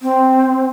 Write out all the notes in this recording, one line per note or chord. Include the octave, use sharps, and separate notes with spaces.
C4